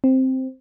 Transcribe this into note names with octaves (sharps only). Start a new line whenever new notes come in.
C4